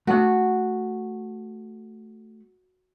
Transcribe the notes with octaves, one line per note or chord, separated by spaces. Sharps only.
A3 F#4 F#5